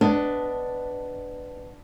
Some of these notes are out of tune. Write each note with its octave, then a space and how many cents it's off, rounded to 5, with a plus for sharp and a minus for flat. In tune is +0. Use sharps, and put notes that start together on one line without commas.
B3 +10 D4 +0 D#5 +0